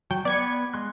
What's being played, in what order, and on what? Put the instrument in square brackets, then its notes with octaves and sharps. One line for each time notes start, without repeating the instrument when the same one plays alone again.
[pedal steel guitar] F#3 [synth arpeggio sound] G5
[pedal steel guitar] B3 B4 [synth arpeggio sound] D5 G#6 C#7
[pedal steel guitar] G#3 C6 F#6